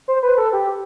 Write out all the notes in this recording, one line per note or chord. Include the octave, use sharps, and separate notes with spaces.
C5
B4
A4
G4